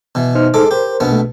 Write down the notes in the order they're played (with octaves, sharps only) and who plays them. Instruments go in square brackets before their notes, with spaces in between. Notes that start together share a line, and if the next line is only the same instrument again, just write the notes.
[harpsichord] B2 E3
[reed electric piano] D#4 C5 F6
[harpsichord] G#3 A4 D6
[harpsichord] G4 [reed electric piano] A#4 C5
[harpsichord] A#1 B2 B3
[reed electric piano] A3